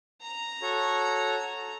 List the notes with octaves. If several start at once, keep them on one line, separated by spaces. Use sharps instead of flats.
A#5
F#4 A4 C#5